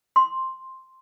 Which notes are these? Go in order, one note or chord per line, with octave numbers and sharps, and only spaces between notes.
C6